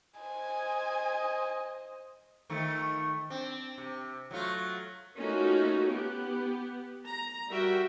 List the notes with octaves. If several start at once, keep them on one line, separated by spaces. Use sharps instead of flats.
C5 D#5 G#5
D#3 F3 A3
C4 D4
C3
F#3 A3 F4
A3 A#3 C#4 D#4 F4 F#4
B3 G4
A#5
G3 F#4 A#4 E5 G5